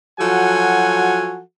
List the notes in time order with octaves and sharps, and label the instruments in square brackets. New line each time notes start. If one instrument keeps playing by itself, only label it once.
[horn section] F3 F#3 F#4 A4 F#5 G#5